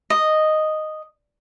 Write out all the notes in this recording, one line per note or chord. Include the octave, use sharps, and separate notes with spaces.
D#5